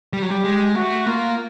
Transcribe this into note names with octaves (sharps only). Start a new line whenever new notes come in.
G3
F#3
G3 G4
G#3
A3 F#4
A#3 F4